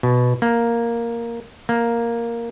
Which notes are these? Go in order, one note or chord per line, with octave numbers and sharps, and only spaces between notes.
B2
A#3
A#3